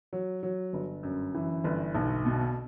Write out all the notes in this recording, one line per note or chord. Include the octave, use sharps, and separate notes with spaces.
F#3
F#3
G1
F#2
E3
G1
B1
B2